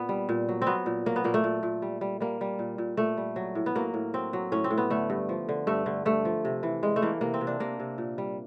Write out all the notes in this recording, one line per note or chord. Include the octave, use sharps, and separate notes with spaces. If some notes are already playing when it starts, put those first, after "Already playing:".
Already playing: A#2 B3
G3
A#2
F#3
C4
F#3 B3
A#2
F#3 A#3
B3
A#2 A#3
A3
A#2
A#2
G3
G3
G3 A#3
G3
A#2
A#2
A#2 A3
G3
F#3
A2
B3
F#3 A#3
A2
F#3 C4
F#3
A2 C#4
C4
A2
B3
D3 A3
G2
F3
D3
G2 A3
D3
G2 A3
F3
C3
E3
G3 G#3
A3
E3 A#3
C3 A#3
C4
C3
D4
C3 A#3
C3
A#2
G3